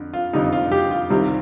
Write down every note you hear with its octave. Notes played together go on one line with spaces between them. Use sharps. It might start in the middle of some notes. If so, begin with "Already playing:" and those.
Already playing: F2 D3
F4
F2 D3 G3 D#4
F4
G4
F4
C2 C3 D#3 G3